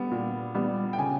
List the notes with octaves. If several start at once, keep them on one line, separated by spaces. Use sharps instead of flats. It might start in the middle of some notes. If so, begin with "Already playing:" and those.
Already playing: G3 B3
A#2
G3 B3
G5
C#3 G#5